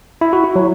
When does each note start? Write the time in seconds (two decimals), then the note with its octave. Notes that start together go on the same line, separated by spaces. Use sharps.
0.21 E4
0.33 F#4
0.44 E4
0.56 F#3